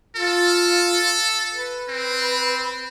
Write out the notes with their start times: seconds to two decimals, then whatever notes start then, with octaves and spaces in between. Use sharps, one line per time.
0.16 F4 A4
1.54 B4
1.89 C4